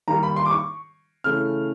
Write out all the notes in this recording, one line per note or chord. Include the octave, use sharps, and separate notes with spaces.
D#3 G3 A#3 A#5
B5
C6
D6
C#6
C#3 E3 A3 F6